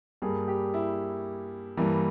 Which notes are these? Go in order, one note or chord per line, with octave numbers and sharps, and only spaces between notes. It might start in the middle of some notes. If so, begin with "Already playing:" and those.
G2 G3 A#3 G#4
G4
E4
G2 E3 G3 A#3